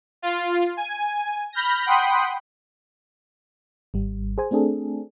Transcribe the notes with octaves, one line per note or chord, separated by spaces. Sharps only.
F4
G#5
B5 F6 G6 A#6
F#5 G5 B5 C6 D#6
G#1 G3
G#4 C5 G#5
A3 C4 D4 G#4 A4